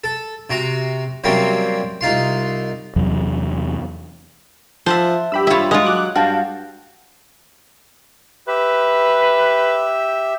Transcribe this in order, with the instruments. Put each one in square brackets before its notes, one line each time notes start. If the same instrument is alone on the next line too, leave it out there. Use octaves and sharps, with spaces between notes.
[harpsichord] A4
C3 F#4 A#5
C3 F#3 G3 A#3 C4 C#4
C2 D#4 F4 C6
[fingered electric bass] E2 C3 F#3
[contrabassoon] F3 [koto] C5 [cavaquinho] E5 F#5 A5
[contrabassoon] G2 [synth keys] G4 B5 E6
[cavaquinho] E4 F4 [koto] C#5 E5
[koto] G#3 F4 [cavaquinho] C#5 F#5
[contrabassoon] F#3 [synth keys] D6 F#6
[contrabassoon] G2 [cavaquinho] F#4 [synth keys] F5 G5 A5
[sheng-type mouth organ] G4 E5 [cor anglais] B4